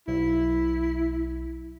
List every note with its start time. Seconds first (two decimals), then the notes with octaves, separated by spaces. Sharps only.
0.08 B1 E4